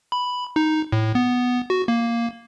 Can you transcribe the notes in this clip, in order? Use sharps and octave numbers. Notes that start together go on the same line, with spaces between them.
B5
D#4
A2
B3
F#4
A#3